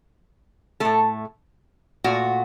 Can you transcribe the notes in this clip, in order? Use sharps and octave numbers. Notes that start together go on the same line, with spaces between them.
A2 A3 A4
A#2 A3 F#4